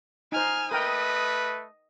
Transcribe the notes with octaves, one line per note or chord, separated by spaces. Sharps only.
D#4 C5 G#5 F6
A3 A#4 B4 D#5 G5 D#6